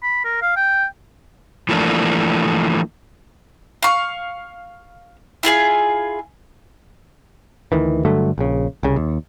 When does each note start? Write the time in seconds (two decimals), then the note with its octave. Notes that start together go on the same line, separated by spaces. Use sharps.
0.03 B5
0.25 A#4
0.42 F5
0.56 G5
1.69 E3 F3 A3 A#3 D4
3.83 F5 C#6
5.43 E4 F4 G#4 G#5
7.72 D2 D#3 E3
8.05 G2 D3 F#3 A3
8.38 A#1 C#3
8.83 C2 C#3
8.96 D#2